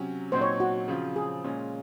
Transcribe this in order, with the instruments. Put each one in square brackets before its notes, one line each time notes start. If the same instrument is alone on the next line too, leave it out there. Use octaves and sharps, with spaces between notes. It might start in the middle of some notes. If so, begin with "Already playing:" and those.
Already playing: [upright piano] C3 F#3 C#4
[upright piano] A#2 F#3 C4 D#4 [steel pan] C5
[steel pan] C#5
F#4
[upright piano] C#3 F3 C4 F4
[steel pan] G#4
[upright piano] A#2 G#3 C#4 F4